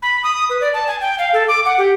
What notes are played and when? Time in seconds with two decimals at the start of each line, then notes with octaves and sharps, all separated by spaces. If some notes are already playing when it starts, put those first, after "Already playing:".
0.02 B5
0.24 D#6
0.50 B4
0.61 D5
0.74 A5
0.87 G#5
1.01 G5
1.19 F5
1.33 A4
1.48 D6
1.65 F#5
1.78 G4